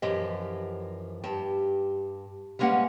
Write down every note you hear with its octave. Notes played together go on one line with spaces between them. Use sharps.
F#2 E3 F3 G4 D#5
G2 G4 A5
G3 G#3 A#3 C#4 B4 F#5